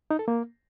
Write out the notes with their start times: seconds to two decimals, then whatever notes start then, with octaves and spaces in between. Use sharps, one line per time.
0.11 D#4
0.19 A4
0.28 A#3